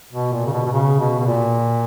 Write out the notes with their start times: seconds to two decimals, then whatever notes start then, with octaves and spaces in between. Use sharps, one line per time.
0.12 B2
0.32 A#2
0.47 C#3
0.52 B2
0.66 B2
0.72 C#3
0.99 B2
1.19 B2
1.26 A#2